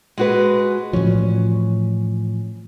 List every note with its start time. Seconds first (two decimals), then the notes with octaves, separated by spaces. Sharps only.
0.18 G#3 F#4 B4
0.93 A2 E3 F3 C#4